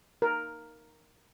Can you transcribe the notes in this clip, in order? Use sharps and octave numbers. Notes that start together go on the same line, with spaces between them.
A#4